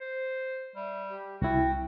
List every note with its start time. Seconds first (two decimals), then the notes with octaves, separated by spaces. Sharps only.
0.01 C5
0.76 G3 E5
1.09 G4
1.42 C2 E4 F#4 G5